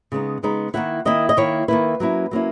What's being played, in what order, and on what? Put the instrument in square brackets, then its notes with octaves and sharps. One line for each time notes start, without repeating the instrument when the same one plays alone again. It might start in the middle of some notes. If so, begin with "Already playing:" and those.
[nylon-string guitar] C#3 G#3 B3 D#4
C#3 G#3 B3 D#4
D#3 A#3 E4 F#5
D#3 A#3 E4 D#5
D#5
D#3 A#3 E4 C#5
D#3 A#3 E4 B4
F#3 A#3 C#4 E4
F#3 A#3 C#4 E4